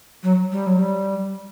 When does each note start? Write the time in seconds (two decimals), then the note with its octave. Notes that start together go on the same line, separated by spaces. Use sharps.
0.23 F#3
0.52 G3
0.66 F#3
0.79 G3